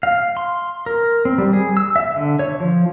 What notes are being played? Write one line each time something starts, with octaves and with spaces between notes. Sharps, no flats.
F5
C6
A#4
C4
G3
G#4
E6
E5
D3
C#5
F3